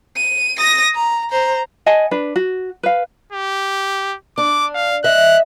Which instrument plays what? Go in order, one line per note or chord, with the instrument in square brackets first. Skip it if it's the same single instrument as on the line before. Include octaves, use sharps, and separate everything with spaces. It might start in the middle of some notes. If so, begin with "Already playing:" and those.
[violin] D#7
D#6 A#6
A#5
C5 A#5
[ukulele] D#5 F#5 G#5 A5
D4 B4
F#4
B4 F5
[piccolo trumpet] G4
[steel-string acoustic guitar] D4 [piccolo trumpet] D6
[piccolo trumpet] F5
[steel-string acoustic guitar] D#5 E5 [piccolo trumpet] F#6